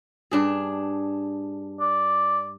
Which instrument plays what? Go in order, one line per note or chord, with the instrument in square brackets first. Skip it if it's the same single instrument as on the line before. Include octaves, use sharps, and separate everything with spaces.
[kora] G2 D4 G#4
[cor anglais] D5